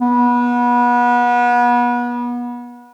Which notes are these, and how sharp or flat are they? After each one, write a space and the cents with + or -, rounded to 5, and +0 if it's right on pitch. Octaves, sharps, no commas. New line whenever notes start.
B3 -30